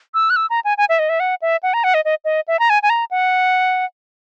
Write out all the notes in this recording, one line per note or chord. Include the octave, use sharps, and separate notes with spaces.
E6
F#6
E6
A#5
G#5
G#5
E5
D#5
E5
F#5
E5
F#5
A#5
F#5
D#5
D#5
D#5
E5
A#5
G#5
G#5
A#5
F#5